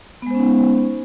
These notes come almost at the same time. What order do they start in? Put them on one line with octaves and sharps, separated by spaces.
B3 G#3 C5 C#4 D#4